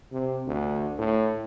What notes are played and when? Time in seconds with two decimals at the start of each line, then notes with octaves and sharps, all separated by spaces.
0.12 C3
0.47 D2
0.98 A2